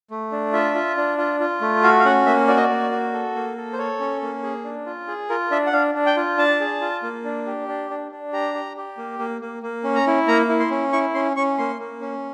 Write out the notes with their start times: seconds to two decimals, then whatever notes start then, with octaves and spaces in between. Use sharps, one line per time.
0.10 A3
0.32 D4
0.53 F4 E5
0.75 F4
0.97 D4
1.18 F4
1.40 F4
1.61 A3
1.83 F#4 F5
2.00 F5
2.05 C#4 F#5
2.26 A#3 E5
2.48 F#4 D5
2.56 D#5
2.63 D5
2.70 A#3
2.91 F#4
3.13 A4
3.35 A#3
3.57 A4
3.73 C5
3.78 A4 C#5
4.00 C#4
4.22 A#3
4.43 G#4
4.64 D4
4.86 F4
5.08 G#4
5.29 F4 A#4
5.51 D4 E5
5.66 F#5
5.73 D4 F5
5.95 D4
6.06 G5
6.17 F4
6.37 D4 A5
6.60 G#4
6.81 F4
7.03 A#3
7.24 D4
7.46 G4
7.68 D4
7.90 D4
8.12 D4
8.33 G4 A#5
8.55 G4
8.77 G4
8.97 A#3
9.19 A#3
9.41 A#3
9.63 A#3
9.84 C#4
9.95 A#5
10.07 E4
10.27 A#3 A#5
10.49 E4
10.60 C6
10.71 C#4
10.92 E4 C#6
11.14 C#4 C6
11.36 C#4 C#6
11.58 A#3 C6
11.80 A#3
12.01 C#4